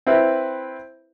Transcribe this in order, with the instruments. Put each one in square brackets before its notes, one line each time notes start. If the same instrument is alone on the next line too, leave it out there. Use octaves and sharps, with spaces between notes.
[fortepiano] C4 E4 B4